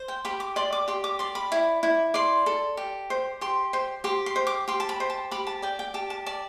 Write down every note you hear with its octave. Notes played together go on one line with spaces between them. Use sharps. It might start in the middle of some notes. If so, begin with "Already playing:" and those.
Already playing: C5
G5
G4 B5
D6
D5 C6
D6
G4 C6
D6
D5 C6
B5
E4
E4
D5 C6
A4
G4
C5
G4 C6
C5
G4 C6
C6
C5
D6
G4 C6
A5
B5
C5
A5
G4 B5
A5
D5 G5
G5
G4 A5
A5
D5 A5